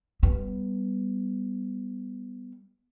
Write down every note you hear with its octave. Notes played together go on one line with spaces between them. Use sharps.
G3 B3